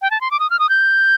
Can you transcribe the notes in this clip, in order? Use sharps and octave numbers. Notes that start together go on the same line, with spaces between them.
G5
A5
C6
D6
D#6
F6
D#6
G6